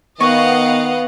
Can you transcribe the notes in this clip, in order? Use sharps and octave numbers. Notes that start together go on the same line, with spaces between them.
D#3 B3 D#5 F5 F#5 G#5 C#6